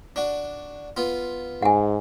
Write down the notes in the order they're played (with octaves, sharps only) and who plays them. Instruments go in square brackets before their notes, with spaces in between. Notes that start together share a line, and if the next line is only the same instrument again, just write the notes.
[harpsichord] D4 F#4
B3 F4
[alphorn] G#2 [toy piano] F#5 G#5